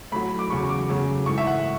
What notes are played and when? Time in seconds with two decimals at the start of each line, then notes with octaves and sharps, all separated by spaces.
0.12 A2 F#3 A3 B5
0.39 D6
0.50 E2 C#3 F#3 C#6
0.69 D6
0.89 F#2 C#3 F#3 A3
1.26 G#2 E3 A3 C#6
1.38 E5
1.46 F#5